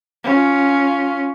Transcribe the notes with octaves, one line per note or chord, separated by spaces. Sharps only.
C#4 F4